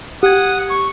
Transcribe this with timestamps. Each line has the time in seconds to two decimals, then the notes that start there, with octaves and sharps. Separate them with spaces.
0.23 G4 F#5 D#6 G#6
0.70 C#6